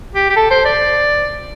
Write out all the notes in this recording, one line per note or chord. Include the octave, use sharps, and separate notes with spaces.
G4
G4
A4
C5
D5